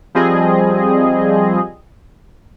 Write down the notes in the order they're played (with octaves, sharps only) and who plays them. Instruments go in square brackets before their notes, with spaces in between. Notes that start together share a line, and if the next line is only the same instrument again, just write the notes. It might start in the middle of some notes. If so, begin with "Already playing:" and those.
[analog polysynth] F3 G3 C4 G#4 D#5